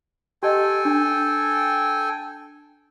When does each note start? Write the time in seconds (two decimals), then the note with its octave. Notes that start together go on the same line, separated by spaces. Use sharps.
0.43 G4 A4 D#5 G5 G#5
0.85 D4